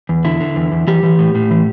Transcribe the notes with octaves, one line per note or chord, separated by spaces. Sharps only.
E2
D3 E4
D3
E2
E2
E3 G4
E3
A2
A2
E3